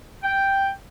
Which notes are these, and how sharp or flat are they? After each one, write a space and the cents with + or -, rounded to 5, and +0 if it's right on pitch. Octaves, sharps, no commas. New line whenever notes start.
G5 +0